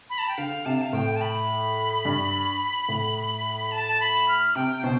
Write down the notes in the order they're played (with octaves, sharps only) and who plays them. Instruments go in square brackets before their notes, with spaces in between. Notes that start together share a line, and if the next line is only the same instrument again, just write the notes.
[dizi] B5
A5
G5
[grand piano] D3 [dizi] F5
[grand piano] C3 [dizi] A5
[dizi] F5
[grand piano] A2 [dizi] G5
[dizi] A5
B5
[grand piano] G2
A2
[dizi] A5
B5
F6
[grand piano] C3 [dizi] G5
[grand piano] B2 [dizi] C5